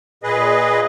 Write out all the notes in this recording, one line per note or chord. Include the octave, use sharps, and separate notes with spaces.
A#2 G#4 B4 D#5